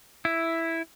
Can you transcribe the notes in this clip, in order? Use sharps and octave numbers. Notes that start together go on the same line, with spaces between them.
E4